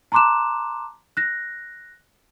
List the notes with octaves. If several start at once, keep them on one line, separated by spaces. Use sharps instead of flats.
A5 A#5 C6 D6 F#6 E7
F#6 A#6